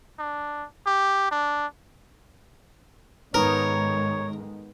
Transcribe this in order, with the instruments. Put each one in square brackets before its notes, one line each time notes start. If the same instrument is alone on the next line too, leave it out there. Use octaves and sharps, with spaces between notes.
[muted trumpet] D4
G4
D4
[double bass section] G#2 D#3 G#3 [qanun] B3 D#4 A4 [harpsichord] A#4 [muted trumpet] C#5